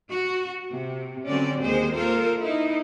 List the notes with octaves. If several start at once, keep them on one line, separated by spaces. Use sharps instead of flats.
F#4
C3
D3 F#3 C4 C#4 D5
D#2 G#3 G#4 C5
A#3 F4 A4 A#4 C5
D#4 E4